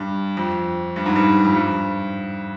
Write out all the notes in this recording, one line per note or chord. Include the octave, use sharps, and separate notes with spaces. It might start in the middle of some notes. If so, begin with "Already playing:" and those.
Already playing: G2
F2
G2
G#2
G2
F2
G2